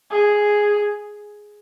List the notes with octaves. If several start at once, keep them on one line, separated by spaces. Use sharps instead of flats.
G#4